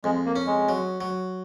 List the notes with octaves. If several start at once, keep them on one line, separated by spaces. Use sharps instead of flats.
F2 G#3
A#3
C#4
G#3
F#3
F#3